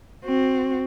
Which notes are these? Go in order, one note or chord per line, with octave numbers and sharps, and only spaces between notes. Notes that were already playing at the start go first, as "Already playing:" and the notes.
C4 F#4